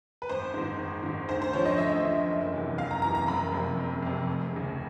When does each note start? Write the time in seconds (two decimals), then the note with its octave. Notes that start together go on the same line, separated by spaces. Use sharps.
0.22 B4
0.29 G#1 C5
0.54 G#2 D#3
0.78 G#1
1.03 G#2 D#3
1.28 D2 C5
1.42 C5
1.53 D3 F3 C#5
1.66 D#5
1.78 D2 E5
2.04 D3 F3
2.28 F#1
2.53 E2 C3 E3
2.77 F#1 F5
2.91 A#5
3.02 E2 C3 E3 A#5
3.15 A#5
3.27 F#1 B5
3.52 F2 C3
3.77 F#1
4.03 F2 C3
4.27 F1
4.53 D#2 C#3